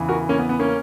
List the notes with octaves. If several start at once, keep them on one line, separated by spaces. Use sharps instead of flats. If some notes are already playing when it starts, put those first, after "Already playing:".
Already playing: E2 C#3 E3
F#4 A#4
A#3 C#4
B3
B3
A#3 C#4